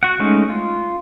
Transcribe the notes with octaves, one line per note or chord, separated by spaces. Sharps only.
F#4 F#5
G#3 A3 C#4 D#4
F4